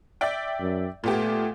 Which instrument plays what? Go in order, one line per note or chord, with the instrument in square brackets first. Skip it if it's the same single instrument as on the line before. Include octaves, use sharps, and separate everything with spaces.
[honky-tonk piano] D5 E5 G5
[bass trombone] F#2
[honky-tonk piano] A#2 B3 G4 [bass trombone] A3